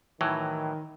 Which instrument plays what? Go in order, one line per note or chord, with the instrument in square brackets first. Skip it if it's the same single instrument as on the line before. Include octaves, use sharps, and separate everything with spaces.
[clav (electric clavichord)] A2 E3 F#3 [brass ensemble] D#3